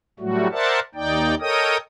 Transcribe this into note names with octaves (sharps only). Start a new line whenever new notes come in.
A2 F#3 G3 A3 F#4
A#4 C5 D5 E5 F#5 A5
D#2 D#4 D5 G5
A4 A#4 C#5 D#5 G5 D#6